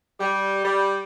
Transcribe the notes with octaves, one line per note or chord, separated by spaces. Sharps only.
G3
G3